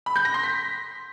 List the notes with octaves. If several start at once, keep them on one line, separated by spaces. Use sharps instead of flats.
B5
G6
A#6
C6
B6